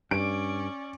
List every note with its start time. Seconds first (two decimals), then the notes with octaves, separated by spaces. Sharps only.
0.11 G2 C#4 D5 D7